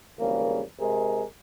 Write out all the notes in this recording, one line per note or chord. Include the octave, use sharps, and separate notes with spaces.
G#1 E2 C#3 G3 A#3
C3 G#3 G#4 A#4